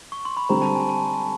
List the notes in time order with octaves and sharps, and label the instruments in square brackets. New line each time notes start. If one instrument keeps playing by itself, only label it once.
[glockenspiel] C#6
C6
B5
[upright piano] D3 G3 C4 [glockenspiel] A#5
[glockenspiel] A5
G#5
A5